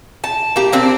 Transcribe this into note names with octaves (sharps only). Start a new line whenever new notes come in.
A5
A#3 G4
A#3 C4 D4